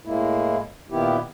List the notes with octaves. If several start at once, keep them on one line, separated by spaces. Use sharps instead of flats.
A2 G#3 A#3 E4
A#2 D#3 B3 E4 G4